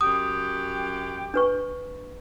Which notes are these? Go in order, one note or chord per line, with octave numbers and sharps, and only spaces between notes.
F#2 G4 D#6
D4 B4 C#6